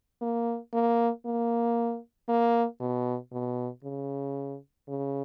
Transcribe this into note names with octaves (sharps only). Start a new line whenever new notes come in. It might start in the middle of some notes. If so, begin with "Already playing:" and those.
A#3
A#3
A#3
A#3
B2
B2
C#3
C#3